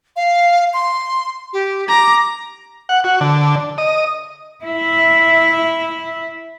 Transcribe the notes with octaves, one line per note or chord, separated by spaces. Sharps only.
F5
C6
G4
A#5 D6
F#5
F#4
D3
D#5
E4 E5